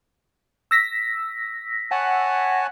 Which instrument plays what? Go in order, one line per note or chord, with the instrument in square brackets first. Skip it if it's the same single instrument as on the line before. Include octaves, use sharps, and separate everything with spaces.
[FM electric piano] E6 A#6 B6
[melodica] C#5 G#5 A5 [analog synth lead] F#5